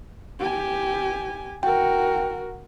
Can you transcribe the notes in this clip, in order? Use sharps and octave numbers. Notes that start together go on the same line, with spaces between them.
G4 G#5
F#4 A#4 G5